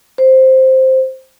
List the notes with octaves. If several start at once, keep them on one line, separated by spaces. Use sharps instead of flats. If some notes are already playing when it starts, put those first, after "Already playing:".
C5